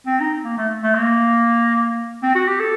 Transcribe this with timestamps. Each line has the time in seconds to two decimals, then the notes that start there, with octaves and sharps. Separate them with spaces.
0.06 C4
0.20 D#4
0.44 A#3
0.57 A3
0.83 A3
0.95 A#3
2.23 C4
2.35 F#4
2.47 G4
2.59 A4